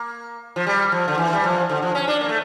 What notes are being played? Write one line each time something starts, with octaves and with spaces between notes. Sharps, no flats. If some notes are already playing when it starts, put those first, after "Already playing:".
Already playing: A#3
F3
G3
F3
D3
E3
G3
F3
D3
F3
C#4
D4
A#3
A3